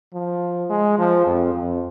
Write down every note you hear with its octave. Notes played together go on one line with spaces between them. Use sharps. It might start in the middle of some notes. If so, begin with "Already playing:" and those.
F3
G#3
F3
F2
F2